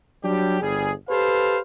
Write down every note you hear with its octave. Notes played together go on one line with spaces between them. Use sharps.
F#3 G3 D4 G4
G1 G3 G#4
G4 A4 B4 C5 F5